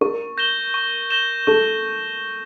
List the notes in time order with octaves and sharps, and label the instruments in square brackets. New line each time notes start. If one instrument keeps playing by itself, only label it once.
[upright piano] A#4 [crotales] C#6
[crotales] G6 A#6 E7 G7
C#6
G6 A#6 E7 G7
[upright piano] A4 [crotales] C#6